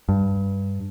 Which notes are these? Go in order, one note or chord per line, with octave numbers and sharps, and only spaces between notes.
G2